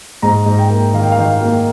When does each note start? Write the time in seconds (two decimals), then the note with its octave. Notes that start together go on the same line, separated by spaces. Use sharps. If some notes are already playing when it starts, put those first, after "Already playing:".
0.22 G#2 A#5
0.46 G#2
0.59 G5
0.70 A#3
0.94 D#3 F5
1.03 G5
1.12 F5
1.18 D#3 G5
1.29 F5
1.41 A#3